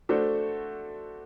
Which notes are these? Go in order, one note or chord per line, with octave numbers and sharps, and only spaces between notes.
A3 D4 F#4 A4 C5